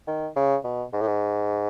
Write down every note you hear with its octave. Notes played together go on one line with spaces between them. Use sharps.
D#3
C#3
B2
G#2
A2
G#2